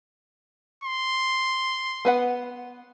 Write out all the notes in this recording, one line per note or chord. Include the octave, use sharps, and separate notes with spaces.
C6
B3 B4 F#5